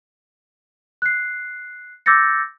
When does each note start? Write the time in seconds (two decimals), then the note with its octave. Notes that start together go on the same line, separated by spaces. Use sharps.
1.02 F#6 C7
2.06 D6 E6 G6 A6 A#6 C#7